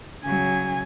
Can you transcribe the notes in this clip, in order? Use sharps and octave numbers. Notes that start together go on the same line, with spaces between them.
C#3 F#3 G#5